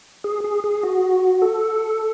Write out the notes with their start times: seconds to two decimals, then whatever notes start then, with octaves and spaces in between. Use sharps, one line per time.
0.24 G#4
0.44 G#4
0.64 G#4
0.83 F#4
1.42 A4